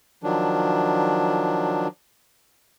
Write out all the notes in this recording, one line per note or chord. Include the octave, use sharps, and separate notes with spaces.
D#3 F3 F#3 D4